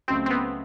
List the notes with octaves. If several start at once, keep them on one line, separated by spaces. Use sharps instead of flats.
C#2 C#3 F#3 A3 C4 C#4
C4
B3